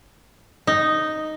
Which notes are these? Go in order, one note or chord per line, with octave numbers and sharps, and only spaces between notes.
D#4